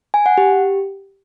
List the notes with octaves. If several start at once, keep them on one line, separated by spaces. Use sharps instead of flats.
G#5
F#5
G4